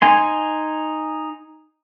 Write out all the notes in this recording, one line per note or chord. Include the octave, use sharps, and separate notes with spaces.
D#4 G#5 C6